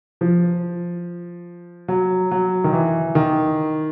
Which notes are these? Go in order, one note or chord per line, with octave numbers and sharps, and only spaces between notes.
F3
F#3
F#3
D#3
E3
D#3